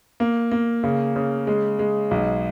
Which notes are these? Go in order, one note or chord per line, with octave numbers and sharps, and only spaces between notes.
A#3
A#3
C#3
C#3
G#3
G#3
B1